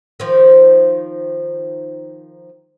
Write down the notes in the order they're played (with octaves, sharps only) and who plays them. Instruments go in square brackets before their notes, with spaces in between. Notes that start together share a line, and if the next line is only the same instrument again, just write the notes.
[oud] D#3 F3